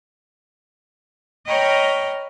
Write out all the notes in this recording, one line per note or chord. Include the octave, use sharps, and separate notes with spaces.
C#5 D#5 G5 A#5 B5 F6